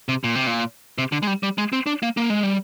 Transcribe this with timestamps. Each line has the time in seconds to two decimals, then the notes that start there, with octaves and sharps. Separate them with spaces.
0.08 C3
0.24 A#2
0.35 C3
0.47 A#2
0.98 C3
1.12 D3
1.22 G#3
1.27 G3
1.43 G3
1.58 G#3
1.73 C4
1.86 D4
2.03 A#3
2.17 A#3
2.30 G#3
2.43 G3